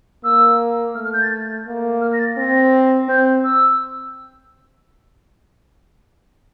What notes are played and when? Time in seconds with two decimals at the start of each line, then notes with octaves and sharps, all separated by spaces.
0.24 A#3 E6
0.95 A3 F6
1.05 F6
1.13 G6
1.22 A6
1.67 A#3
2.01 F6
2.13 A#6
2.19 A6
2.37 C4 A#6
3.08 C4 G6
3.44 E6